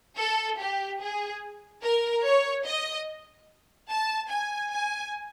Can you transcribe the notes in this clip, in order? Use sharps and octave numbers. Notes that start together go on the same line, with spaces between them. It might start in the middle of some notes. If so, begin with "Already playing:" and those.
A4
G4
G#4
A#4
C#5
D#5
A5
G#5
G#5